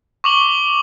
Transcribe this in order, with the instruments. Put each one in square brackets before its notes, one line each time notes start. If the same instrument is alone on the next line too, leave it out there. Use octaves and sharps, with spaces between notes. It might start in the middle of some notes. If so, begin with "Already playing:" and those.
[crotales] C#6 D6 F#7 G7